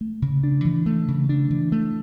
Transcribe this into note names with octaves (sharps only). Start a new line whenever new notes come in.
A3
C#3
D4
E3
A3
C#3
D4
E3
A3